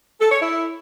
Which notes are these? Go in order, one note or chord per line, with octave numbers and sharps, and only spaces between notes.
A4
C#5
E4